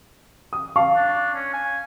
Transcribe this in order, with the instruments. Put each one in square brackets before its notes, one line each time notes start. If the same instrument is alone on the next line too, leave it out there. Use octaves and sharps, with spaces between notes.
[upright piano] D#6
F5 A5 C#6
[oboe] D4
C#4
G#5